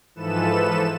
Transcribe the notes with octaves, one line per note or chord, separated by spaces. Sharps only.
G#2 E3 F3 A4 B4 E7